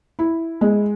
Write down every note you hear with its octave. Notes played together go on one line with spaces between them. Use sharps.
E4
G#3